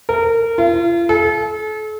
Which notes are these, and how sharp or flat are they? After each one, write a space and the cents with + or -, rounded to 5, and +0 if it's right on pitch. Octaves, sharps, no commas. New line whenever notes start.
A#4 -25
F4 -40
A4 -40